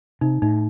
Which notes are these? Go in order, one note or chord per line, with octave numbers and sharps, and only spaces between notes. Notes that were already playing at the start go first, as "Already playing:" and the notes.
C3 D#4
A2 D#4